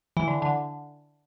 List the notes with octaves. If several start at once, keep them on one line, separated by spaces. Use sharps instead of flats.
E3
D3
D3